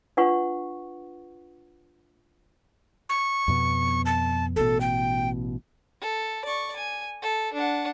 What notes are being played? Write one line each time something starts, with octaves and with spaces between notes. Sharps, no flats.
D4 F4 B4 F#5 C#6
C#6
F2 B2 B3
A5
A1 B2 A4
G5
A4
D5 C#6
G#5
A4
D4 F#5